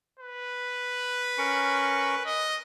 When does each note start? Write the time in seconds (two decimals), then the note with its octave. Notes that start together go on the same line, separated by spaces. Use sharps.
0.19 B4
1.38 C#4 A#4 C#6
2.26 D#5